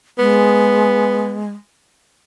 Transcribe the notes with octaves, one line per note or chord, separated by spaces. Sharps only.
G#3 B3